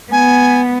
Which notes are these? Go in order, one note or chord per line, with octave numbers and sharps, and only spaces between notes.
B3 G#5